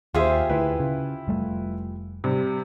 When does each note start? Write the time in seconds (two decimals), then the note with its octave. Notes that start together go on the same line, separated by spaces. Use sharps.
0.14 D#2 F4 G4 G#4 C5 E5
0.50 D2 E4 F4 B4
0.80 C#3
1.28 F1 G3 A3
2.24 C3 G3